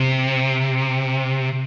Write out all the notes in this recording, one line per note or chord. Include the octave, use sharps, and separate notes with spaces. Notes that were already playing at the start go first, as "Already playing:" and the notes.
Already playing: C3